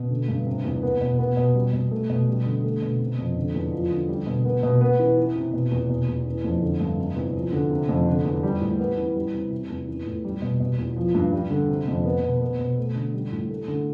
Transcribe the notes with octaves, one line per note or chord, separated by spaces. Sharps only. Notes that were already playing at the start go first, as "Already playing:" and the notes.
Already playing: B2
D3
G2
C3
E2
B3
B2
B3
B2
G3
B2
A3
B2
G3
D3
A3
B2
C3
F2
D3
E2
F3
D3
G3
B2
B3
B2
B3
E3
E3
C3
B2
E2
B2
E2
E3
F2
D3
G2
C3
E2
F3
D3
C3
F2
D3
E2
G3
A2
B3
E3
G3
C3
C3
E2
E3
A2
G3
B2
B2
E2
F3
G2
G3
D3
C3
F2
B3
B2
B3
B2
A3
D3
G3
A2
A3
D3